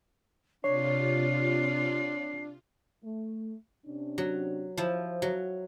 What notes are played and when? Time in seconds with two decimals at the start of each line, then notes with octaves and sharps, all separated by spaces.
0.64 C3 D4 F4 C#5 C7
3.04 A3
3.86 C3 C#4 D4
4.18 F#3
4.77 F3 E4 C5
5.22 F#3